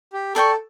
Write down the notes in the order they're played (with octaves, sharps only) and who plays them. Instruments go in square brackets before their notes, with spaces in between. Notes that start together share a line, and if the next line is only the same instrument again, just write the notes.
[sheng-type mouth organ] G4
[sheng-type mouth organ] A4 [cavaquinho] A#4 D5 G5 C#6